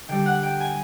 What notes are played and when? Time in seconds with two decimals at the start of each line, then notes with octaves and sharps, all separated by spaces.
0.08 D3 G3 G5
0.26 F#5
0.43 G5
0.60 G#5